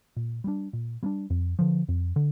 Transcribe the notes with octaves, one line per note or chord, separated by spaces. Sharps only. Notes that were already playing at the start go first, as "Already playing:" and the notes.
A#2
G3 A#3 D4
A#2
G3 A#3 D4
F2
D3 F3
F2
D3